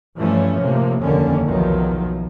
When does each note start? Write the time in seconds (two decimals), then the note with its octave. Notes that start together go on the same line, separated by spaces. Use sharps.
0.16 G2 E3 F3 A3 C#4
0.60 A2 C3 F3 A#3
1.02 F1 D#2 D3 D#3 A#3 C#4
1.46 B1 E2 D#3 F3 F#3